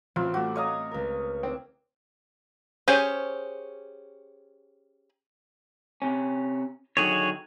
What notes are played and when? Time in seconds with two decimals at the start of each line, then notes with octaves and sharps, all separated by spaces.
0.16 A1 C4 F4
0.34 A3 F#4 D6 G6
0.56 C#5 D#5 F5 A#5 D#6
0.91 C#2 A#4
1.43 C4 D4
2.88 C#4 G4 G#4 C5 G#5
6.02 C3 C#4
6.97 D3 D#3 F#3 F#4 G#4 C#5